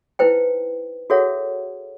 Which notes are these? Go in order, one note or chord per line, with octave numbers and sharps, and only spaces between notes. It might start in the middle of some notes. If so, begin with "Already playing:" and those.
D#4 E4 B4 C5 G5
F#4 G#4 A4 C#5 E5 F#5